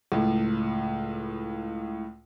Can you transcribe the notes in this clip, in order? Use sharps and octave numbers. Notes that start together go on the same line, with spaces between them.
C#2 A2